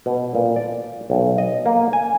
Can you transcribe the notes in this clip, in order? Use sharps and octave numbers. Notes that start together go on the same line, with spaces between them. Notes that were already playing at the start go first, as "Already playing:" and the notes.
B2
A#2
D5
B1
D#5
A#3
G#5